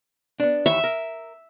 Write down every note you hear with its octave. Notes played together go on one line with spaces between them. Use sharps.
B3 D4
D#2 E3 C#5 E5
A#4